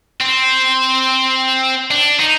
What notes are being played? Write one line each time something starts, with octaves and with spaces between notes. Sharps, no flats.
C4
D4
D#4